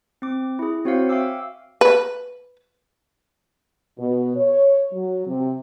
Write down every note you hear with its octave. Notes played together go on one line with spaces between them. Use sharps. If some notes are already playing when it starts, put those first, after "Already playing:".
C4 D6
E4 G#4
C4 F#4 C5 C#5 F5 C#7
E5 F5 G5 G#5 D6 E6
B4
B2
C#5
F#3
C3